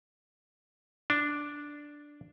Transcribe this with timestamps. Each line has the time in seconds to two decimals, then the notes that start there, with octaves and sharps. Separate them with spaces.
1.10 D4